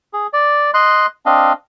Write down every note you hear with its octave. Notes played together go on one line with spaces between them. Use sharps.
G#4
D5
D#5 C6 F#6
C4 D4 D#5 F5